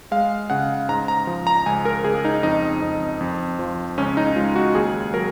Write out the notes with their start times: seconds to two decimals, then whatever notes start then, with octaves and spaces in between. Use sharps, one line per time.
0.11 G#3 F5
0.50 C#3 F#5
0.89 G#2 A#5
1.08 A#5
1.27 F3
1.47 A#5
1.66 C#2 G#5
1.85 A#4
2.04 C#2 G#4
2.25 D#4
2.43 F2 D#4
2.82 F2
3.21 F2
3.59 F3
3.98 C#2 C#4
4.17 D#4
4.36 G#3 F4
4.56 F#4
4.75 D#2 G#4
5.14 F#3 A#4